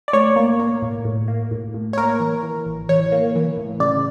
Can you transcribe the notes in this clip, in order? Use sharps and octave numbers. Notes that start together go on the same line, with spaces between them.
D5
A2 C#5
A#3
A#3
A2
A2
A#3
A2
A2
C#5
A#3 A#4
E3
E3
A1
E3 C#5
A#3
E3
A2
C#3 D5